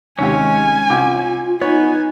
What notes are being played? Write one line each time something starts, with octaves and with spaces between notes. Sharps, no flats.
D#2 C3 G#3 C#4 G4 G#5
C2 F4 G5 D6
B3 D#4 C#5 G#5